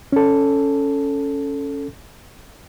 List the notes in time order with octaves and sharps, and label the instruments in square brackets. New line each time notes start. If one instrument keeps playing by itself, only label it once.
[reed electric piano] C#4 A4